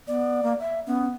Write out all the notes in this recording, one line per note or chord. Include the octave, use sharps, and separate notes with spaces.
B3 D5
A#3
E5
B3 C#4